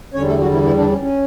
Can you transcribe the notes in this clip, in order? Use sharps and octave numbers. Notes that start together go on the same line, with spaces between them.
E2 D3 G3 C#4 C#5
A3 A4
F#3 F#4
E3 E4
E3 E4
D3 D4
C#4
C#4